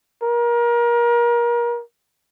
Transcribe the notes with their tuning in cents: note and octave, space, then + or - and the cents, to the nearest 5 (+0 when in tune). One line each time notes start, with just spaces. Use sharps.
A#4 +30